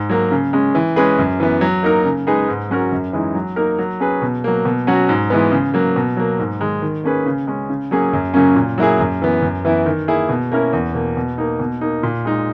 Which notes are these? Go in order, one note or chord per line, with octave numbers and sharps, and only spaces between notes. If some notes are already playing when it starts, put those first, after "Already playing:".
Already playing: G#2
F#3 A#3
C#3
G#3 C#4
E3
G#3 C#4 G#4 B4
F#2
E3 B3
F#3
A#3 D#4 A#4
C#3
G#3 D#4 G#4 B4
G#2
F#3 C#4 F#4 A#4
F#2
E3 G#3 D#4
F#3
A#3 D#4 A#4
F#3
C#4 G#4 B4
B2
F#3 A#3
B2
F#3 C#4 F#4
G#2
E3 G#3 B3
C#3
F#3 A#3
B2
F#3 A#3
G#2
D#3 G#3
D#3
A#3 C#4 G#4 B4
C#3
G#3 C#4
C#3
F#3 A#3 C#4 G#4
F#2
C#3 F#3 A#3 C#4
A#2
F#3 A#3 E4 G#4
F#2
E3 B3
F#2
E3 B3 E4
D#3
A#3 E4 G#4
B2
A#3 C#4 E4 A#4
E2
B2 A#3
B2
A#3 D#4
B2
A#3 D#4
A#2
G#3 D#4